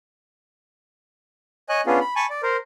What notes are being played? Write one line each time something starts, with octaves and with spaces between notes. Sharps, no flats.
C#5 D#5 G#5 F#6
B3 C#4 D4 F4 G#4
B5
G#5 A5 B5 C#6
D5
A#4 C5